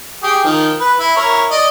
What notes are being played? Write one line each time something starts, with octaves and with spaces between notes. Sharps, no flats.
G4 G#4
D#3 F3
B4
E4
E4 A#4 C#5
D5 D#5